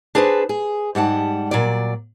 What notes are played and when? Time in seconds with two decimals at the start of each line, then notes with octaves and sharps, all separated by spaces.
0.15 D4 G#4 B4 C5 A5
0.49 G#4
0.95 G#2 G3 F#5 A5
1.51 A#2 F#3 D5